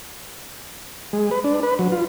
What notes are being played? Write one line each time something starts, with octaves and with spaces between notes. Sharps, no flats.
G#3
B4
D4
B4
F#3
F4